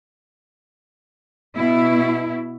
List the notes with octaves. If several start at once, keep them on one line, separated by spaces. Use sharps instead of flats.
B2 E4